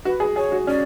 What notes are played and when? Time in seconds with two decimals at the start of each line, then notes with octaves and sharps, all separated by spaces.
0.05 F#4 B4
0.20 G#4
0.36 G#4 C#5
0.52 F#4
0.67 C#4 D5